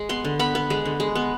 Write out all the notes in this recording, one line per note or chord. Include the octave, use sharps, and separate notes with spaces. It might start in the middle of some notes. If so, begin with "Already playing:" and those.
Already playing: G#3
B3 C6
D3
B3 B5
B3
G#3
D3
G#3
B3